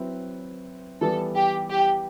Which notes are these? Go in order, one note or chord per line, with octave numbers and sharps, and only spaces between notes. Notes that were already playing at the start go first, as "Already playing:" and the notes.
Already playing: F#3 C4 E4 B4
E3 G3 B3 A4
G4
G4